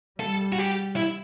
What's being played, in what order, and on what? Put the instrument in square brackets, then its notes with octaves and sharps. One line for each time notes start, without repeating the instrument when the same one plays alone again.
[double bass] G3 [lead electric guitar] A4
[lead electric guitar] F#4
G4
E4